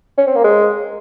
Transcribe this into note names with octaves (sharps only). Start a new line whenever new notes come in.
C#4
C4
A#3
G#3